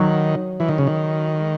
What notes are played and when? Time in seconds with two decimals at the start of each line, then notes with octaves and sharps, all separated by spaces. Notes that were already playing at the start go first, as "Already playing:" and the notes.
Already playing: D#3 F#3
0.60 E3
0.69 D#3
0.78 C#3
0.87 D#3
1.41 G#3